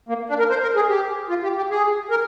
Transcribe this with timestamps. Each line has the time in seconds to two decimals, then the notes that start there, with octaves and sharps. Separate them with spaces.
0.09 A#3
0.29 D4
0.39 A#4
0.50 C5
0.62 A#4
0.76 G#4
0.89 G4
1.29 F4
1.43 G4
1.57 G4
1.70 G#4
2.10 A#4